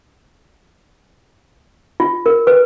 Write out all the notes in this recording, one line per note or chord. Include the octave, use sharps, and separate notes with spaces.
F4
A#4
B4